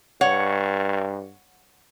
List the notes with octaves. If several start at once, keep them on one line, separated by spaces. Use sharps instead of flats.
G2 C#5 F#5